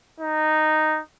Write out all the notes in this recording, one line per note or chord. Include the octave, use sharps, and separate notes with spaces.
D#4